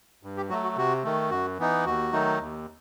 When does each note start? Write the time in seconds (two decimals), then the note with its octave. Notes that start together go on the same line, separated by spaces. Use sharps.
0.23 G2
0.37 G4
0.49 F#3 A3 F#4
0.64 F#4
0.76 C3 F#4
1.03 D#3 A3
1.30 F#2 F#4
1.58 E3 B3 D#4
1.85 D#2 F#4
2.12 D#3 F#3 A3 D#4
2.39 D#2